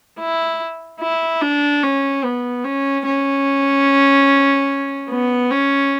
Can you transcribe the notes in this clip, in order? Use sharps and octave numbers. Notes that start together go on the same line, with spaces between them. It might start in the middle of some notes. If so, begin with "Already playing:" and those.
E4
E4
D4
C#4
B3
C#4
C#4
B3
C#4